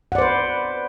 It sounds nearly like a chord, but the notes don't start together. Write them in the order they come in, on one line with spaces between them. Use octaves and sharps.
F#5 D5 C5 B4